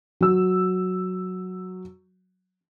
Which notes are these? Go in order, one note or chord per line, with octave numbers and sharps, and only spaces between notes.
F#3 E6